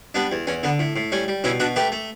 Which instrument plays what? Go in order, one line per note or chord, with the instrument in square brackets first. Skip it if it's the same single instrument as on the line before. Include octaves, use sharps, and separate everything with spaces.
[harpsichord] G3 B3 D4
E2
E2 C#4
D3 B3
A2
A2
G3 C#4
G3
B2 C#4 E4
B2 D4 F#4
A3 G4 B4
A3